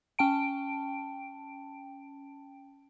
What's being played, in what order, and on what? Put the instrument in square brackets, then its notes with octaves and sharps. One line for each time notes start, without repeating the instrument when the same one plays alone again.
[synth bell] C#4 G5 A5 D7